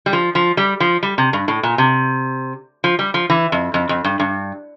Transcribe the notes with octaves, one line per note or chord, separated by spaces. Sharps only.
G3
F3
F3
G3
F3
G3
C3
G2
A2
A#2
C3
F3
G3
F3
E3
F2
F2
F2
G2
G2